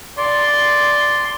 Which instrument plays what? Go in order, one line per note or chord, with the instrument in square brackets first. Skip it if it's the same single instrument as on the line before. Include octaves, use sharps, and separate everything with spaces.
[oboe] D5 [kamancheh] C6